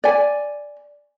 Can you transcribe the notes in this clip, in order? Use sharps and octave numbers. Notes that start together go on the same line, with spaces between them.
D5 G#5